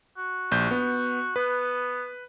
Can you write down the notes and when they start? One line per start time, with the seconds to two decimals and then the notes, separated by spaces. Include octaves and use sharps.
0.17 F#4
0.51 A#1 G6
0.71 B3
1.36 B3 B4